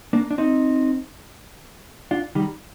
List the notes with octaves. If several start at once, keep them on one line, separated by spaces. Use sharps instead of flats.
A#3 D4
D4
C4 D#4
D4 F4
D#3 G3